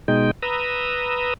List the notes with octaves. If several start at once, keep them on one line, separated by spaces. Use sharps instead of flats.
B2 G#3 D#4 G5
B4 A#5 D#6 E6